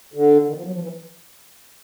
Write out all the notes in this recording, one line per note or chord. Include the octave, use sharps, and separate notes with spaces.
D3
D#3
F3
F#3
F3
E3